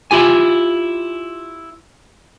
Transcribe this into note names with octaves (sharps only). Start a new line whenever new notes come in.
E4 F4 G4 G#5